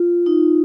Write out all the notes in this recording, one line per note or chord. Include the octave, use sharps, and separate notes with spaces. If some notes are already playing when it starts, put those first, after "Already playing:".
Already playing: F4
D#4